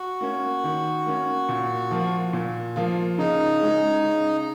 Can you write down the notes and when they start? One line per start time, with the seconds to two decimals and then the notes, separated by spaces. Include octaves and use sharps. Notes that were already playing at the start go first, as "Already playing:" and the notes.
Already playing: F#4
0.21 A#3 C#4
0.64 D#3
1.06 A#3 C#4
1.49 A#2
1.91 F3 A#3 F4
2.33 A#2
2.76 F3 A#3 F4
3.18 C#3 D#4
3.61 G#3 C#4 G#4
4.03 C#3